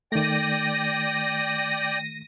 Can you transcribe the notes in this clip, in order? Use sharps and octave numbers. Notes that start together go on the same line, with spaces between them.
D#3 A3 D5 G5 A#6 D#7